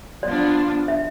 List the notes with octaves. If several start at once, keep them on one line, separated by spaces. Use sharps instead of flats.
F3 B3 D4 F4 D5
E5